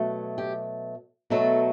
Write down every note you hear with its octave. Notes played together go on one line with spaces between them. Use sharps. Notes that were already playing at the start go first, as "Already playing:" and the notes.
Already playing: B2 F#3 A3
G4
B2 F#3 A3 A4